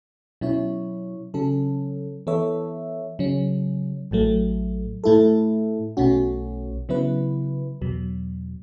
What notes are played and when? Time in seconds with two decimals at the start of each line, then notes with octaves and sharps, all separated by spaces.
0.41 B2 F#3 C#4 E4 C#5
1.34 C#3 F#3 C#4 A4
2.27 E3 B3 A4 C#5 E5
3.19 C#3 F#3 C#4
4.11 A1 A2 F#3 A3
5.04 A2 A3 E4 A4
5.97 B1 B2 A3 C#4 F#4
6.89 C#3 F#3 B3 E4 B4
7.82 E2 B2 F#3